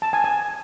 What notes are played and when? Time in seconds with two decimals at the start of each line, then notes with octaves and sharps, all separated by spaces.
0.02 A5
0.13 G#5
0.24 G#5